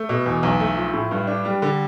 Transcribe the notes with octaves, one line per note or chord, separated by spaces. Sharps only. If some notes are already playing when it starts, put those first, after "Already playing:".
Already playing: A3
B2
E2
B1
A3
F3
A2
G2
D4
G3
D3